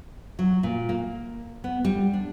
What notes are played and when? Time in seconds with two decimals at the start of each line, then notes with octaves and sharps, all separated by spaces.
0.39 F#3
0.63 A#2
0.89 A#3
1.64 B3
1.85 G3
2.13 D4